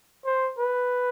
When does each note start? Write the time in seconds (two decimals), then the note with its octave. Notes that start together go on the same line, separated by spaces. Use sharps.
0.26 C5
0.59 B4